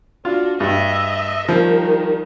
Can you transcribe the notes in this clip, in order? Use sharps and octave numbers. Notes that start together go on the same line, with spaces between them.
D4 F4 F#4
G2 D#5 E5
D#3 F3 G3